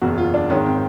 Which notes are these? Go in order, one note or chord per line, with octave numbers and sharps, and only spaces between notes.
F#1 E2 B2 F#4
F4
D4
G#1 G#2 D#3 C#4
C4